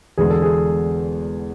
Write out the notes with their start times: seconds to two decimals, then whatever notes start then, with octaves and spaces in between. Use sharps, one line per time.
0.18 E1 E2 D3 G#3 G#4
0.30 A4
0.42 G#4